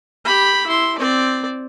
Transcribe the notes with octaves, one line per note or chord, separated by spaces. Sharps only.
G4 B5
E4 C6
C4 D5